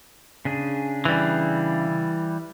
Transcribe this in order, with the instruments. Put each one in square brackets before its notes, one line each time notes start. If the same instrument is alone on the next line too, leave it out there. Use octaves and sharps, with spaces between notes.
[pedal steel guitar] C#3 D4 G#4
[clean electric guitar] E3 G3